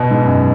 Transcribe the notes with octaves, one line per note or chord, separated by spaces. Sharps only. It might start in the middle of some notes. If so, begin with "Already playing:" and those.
Already playing: B2
G#2
F#2